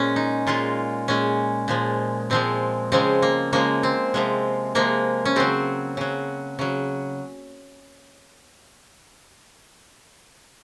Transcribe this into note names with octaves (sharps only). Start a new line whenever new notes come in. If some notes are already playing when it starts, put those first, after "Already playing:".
Already playing: A#2 G#3 C#4
D#4
A#2 G#3 F4
A#2 G#3 C#4
A#2 F3 G#3
A#2 F3 G#3 C4
C#3 F3 G#3 C4
A#3
C#3 F3 G#3 A#3
C4
C3 F3 G#3
C3 F3 G#3 A#3
C#4
C#3 F#3 C4
C#3 F#3
C#3 F#3